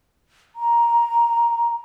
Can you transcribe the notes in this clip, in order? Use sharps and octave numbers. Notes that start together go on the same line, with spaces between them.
A#5